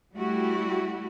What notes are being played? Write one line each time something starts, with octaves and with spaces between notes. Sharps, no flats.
G3 A3 E4 F#4 G4